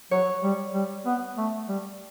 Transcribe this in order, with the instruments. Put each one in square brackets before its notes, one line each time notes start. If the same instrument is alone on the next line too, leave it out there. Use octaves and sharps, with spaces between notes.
[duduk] F#3 [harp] C#5
[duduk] G3
G3
B3
A3
G3